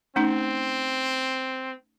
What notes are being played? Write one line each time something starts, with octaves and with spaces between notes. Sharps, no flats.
A3 C4 C#4 D#4